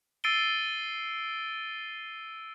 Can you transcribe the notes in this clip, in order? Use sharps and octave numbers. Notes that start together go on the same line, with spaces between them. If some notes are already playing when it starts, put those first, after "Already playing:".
E6 A6 C7 D7 D#7 G7